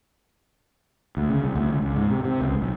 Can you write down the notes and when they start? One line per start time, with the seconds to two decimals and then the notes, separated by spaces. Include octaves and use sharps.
1.17 D2
1.30 C#3
1.44 C2
1.55 D2
1.70 C#2
1.82 C#2
1.96 G#2
2.11 C3
2.25 C3
2.41 C#2
2.61 B1